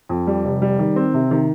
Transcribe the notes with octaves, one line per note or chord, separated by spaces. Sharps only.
F2
G3
F1
G3
D#3
C4
C3
D#3